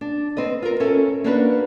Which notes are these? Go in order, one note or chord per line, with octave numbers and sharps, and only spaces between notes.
D4
C4 B4 D#5
F4 A#4
C#4 A4 A#4 E5
A#3 C#4 D4 F#4 A#4 B4